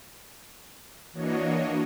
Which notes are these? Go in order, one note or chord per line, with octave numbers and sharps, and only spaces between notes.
E3 A#3 D4 F#4 C#5 D#5